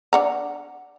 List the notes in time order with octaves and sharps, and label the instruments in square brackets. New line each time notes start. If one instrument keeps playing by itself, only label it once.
[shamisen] D4 F#5 A#5